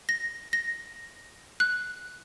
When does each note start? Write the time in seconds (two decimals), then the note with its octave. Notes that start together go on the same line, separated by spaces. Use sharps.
0.09 A#6
0.53 A#6
1.60 F#6